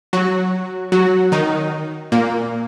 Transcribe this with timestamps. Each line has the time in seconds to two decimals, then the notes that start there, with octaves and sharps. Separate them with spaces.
0.13 F#3 F#4
0.92 F#3 F#4
1.32 D#3 D#4
2.12 A#2 A#3